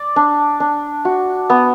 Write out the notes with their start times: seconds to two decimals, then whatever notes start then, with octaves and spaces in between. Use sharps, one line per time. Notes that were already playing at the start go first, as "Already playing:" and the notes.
Already playing: D5
0.16 D4
0.60 D4
1.05 F#4
1.50 B3